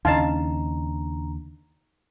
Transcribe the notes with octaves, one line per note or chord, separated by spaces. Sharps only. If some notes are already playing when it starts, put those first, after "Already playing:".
D#2 C#3 D4 D#4 D#5 F5 A5 A#5